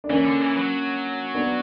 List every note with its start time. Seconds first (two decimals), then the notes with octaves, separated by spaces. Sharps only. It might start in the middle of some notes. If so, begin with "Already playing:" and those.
0.04 D4
0.10 E3 A#3 C#4
0.26 D3
0.41 E3
0.57 F#3
1.35 B3 D4